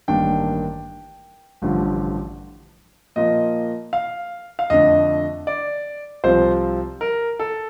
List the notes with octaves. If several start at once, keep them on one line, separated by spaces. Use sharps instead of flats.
A1 G2 D#3 A#3 D4 G5
A1 G2 D3 F3
A#2 F3 A#3 D#5
F5
F5
F2 D3 A3 D4 D#5
D5
C2 C3 F3 C4 F4 C5
A#4
A4